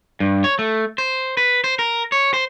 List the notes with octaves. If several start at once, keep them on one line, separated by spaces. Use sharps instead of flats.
G2
C#5
A3
C5
B4
C5
A#4
C#5
C5